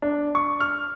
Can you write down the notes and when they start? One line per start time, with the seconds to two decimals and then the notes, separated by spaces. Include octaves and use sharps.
0.02 D4
0.35 C#6
0.60 F6